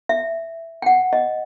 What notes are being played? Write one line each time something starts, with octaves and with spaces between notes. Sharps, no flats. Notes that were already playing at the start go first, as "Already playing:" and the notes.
E5
G5
F#5
D#5